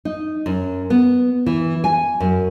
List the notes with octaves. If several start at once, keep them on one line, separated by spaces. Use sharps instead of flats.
D#4
F#2
B3
E3
G#5
F#2